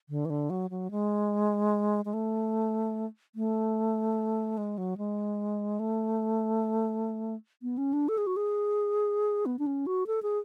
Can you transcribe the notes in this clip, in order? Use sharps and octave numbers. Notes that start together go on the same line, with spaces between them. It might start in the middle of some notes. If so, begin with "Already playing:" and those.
D3
E3
D3
F#3
F#3
G#3
G#3
A3
A3
G#3
F#3
G#3
A3
B3
C#4
D4
A4
G#4
F#4
G#4
B3
D4
C#4
F#4
A4
G#4